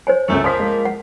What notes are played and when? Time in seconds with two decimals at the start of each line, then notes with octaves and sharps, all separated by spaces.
0.07 C5 C#5 G#5
0.29 G1 C#2 F#2 A3
0.44 F3 A#3 C5 G#5 D#6 B6
0.60 G#3 A#4
0.85 F#5